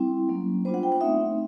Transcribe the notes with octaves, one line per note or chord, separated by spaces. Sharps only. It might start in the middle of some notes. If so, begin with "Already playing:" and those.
Already playing: G3 C4 E4
F#3 A#3 C#4
G3 B3 D4 F4 C5
F#5
G5
F#5
A3 C4 D#4 E5